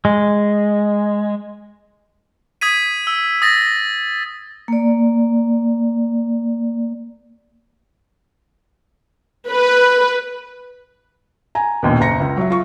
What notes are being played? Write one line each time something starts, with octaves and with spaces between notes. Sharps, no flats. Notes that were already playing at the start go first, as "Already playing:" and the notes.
G#3
D#6 G#6 B6 D#7
E6
D#6 A6 A#6
A#3 D5
B4
G#5 A#5
A#1 D#2 B2
F#1 A#5 A#6 C#7
C#2
F#3 E5
F4 C#6